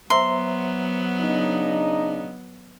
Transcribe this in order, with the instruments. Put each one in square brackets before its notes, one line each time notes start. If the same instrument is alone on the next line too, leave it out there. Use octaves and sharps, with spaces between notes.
[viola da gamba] F#3 B3 [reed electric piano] C5 E5 A#5 [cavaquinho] C6
[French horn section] C#3 D4 D#4